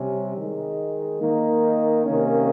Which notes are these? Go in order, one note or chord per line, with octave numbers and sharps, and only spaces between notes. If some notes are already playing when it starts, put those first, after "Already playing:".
Already playing: C3 G3 C#4
D#3 G#3 D#4
D#3 A#3 D#4
C3 D#3 A#3 C#4